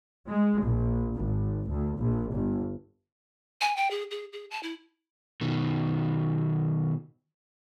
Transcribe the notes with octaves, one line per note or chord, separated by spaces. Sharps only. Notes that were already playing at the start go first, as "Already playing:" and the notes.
G#3
A#1
G#1
D2
A#1
G1
G#5
G5
G#4
G#4
G#4
A5
E4
B2 D#3